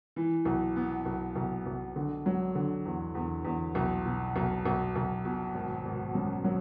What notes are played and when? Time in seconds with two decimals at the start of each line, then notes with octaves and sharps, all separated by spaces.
0.16 E3
0.45 B1
0.76 B3
1.05 B1
1.36 B1
1.66 B1
1.96 D3
2.26 F#3
2.55 D3
2.85 E2
3.15 E2
3.45 E2
3.75 B1
4.05 B2
4.36 B1
4.65 B1
4.96 B1
5.25 B2
5.54 G#1
5.85 G#1
6.15 F#2
6.44 F#3